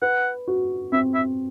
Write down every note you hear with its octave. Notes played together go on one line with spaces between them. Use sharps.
B4 F#5
F#4
C4 E5
E5